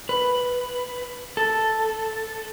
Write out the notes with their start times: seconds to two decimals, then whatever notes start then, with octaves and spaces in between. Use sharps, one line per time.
0.09 B4
1.37 A4